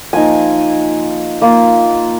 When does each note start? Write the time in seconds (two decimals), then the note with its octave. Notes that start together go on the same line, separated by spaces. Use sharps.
0.13 F3 A#3 D#4 G#5
1.42 A#3 F4